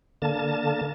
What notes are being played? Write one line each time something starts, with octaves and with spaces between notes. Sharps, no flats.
D3 A#3 A5